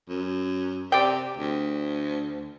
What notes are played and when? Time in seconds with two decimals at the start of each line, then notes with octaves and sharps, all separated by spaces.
0.09 F#2
0.92 C3 D5 G5
1.37 D2